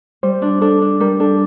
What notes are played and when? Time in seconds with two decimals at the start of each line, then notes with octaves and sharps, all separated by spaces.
0.23 G3 C5
0.42 D4
0.62 D4 A4
0.82 D4
1.00 G3 A#4
1.20 D4 A4